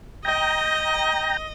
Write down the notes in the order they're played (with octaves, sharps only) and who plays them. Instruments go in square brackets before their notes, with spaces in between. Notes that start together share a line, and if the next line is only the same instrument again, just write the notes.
[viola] D#5 [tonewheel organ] G5 A#5